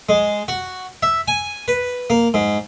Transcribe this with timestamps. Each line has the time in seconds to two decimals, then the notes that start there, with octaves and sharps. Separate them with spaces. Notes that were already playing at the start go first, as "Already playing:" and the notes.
0.09 G#3
0.48 F#4
1.03 E5
1.28 G#5
1.68 B4
2.10 A#3
2.34 G#2